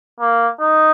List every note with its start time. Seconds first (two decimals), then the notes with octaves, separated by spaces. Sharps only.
0.20 A#3
0.60 D#4